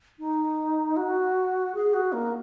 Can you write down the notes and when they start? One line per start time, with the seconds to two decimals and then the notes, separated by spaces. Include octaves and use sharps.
0.19 D#4
0.97 F#4
1.75 G#4
1.94 F#4
2.13 A#3